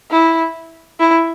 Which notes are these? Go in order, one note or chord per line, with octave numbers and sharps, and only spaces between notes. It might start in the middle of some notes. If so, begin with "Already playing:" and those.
E4
E4